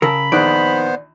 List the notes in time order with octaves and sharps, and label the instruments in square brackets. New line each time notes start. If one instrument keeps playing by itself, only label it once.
[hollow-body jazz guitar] C#3 A#4 [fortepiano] A5 E6 [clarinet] B5
[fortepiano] A#1 D#3 F#6 [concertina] B3 C5 [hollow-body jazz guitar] D5